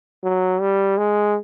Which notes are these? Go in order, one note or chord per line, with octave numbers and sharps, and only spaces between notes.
F#3
G3
G#3